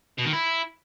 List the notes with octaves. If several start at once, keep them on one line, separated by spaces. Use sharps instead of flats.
B2
D#3
E4